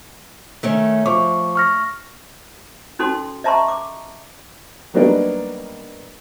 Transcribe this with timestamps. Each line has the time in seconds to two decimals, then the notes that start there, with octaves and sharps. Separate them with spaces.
0.63 D#3 A3 C#4
1.06 F3 C#6 D6
1.55 C#6 F6 A#6
2.99 C#4 D#4 F#4 A4 C6
3.44 D#5 E5 A5 A#5 C6 C#6
3.68 D6
4.94 F#3 G3 A#3 B3 D4 D#4